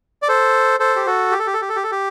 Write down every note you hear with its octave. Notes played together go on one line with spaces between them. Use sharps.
D5
A4 C5
A4 C5
G4
F#4 A4
G4
A4
G4
A4
G4
A4
G4
A4
G4